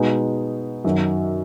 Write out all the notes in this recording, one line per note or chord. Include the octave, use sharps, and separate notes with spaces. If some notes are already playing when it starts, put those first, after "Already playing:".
Already playing: B2 G#3 B3 D#4
F#2 D#3 F#3